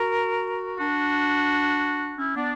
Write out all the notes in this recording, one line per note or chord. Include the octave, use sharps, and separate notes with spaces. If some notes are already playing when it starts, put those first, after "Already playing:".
Already playing: F#4 A#4
D4 F#4
C#4 E4
B3 D4